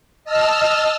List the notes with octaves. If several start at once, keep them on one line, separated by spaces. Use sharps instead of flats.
D#5 A5 E6 F6